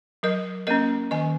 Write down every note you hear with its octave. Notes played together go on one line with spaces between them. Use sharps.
F#3 A#4 D#5
A#3 C#4 A#4 D#5
D#3 D#5 G#5